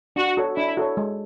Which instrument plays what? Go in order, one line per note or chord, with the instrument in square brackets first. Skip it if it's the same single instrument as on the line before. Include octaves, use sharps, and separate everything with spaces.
[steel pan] D4 [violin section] F#4
[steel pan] F#4 A4 C#5
[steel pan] D4 [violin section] E4
[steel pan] F#4 A4 C#5
G#3